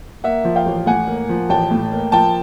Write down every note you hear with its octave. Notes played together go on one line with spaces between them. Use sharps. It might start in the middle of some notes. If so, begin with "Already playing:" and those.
A#3 E5 F#5
F3
F5 G5
A1
A2 F#5 G#5
A#3
F3
A1 G5 A5
A2
A#3
F3 G5 A5